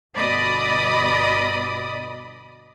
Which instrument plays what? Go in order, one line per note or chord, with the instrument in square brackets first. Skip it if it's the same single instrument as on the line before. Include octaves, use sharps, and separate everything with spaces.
[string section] G1 B2 D5 D#5 B5 D#6